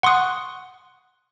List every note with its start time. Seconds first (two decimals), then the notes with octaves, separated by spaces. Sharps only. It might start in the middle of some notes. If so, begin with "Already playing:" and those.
0.03 F#5 C6 C#6 D#6 F#6